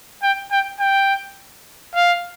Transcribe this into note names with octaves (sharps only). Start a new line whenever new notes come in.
G5
G5
G5
F5